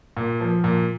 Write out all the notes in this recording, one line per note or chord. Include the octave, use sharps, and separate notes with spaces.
A#2
F3
A#2